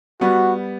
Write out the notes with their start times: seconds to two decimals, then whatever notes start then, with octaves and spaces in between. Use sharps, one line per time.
0.21 G3 B3 F#4